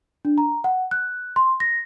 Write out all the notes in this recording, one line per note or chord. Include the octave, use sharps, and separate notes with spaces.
D4
A#5
F#5
F#6
C6
A#6